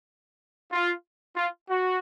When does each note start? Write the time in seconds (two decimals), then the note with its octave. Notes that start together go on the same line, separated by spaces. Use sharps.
0.72 F4
1.36 F4
1.69 F#4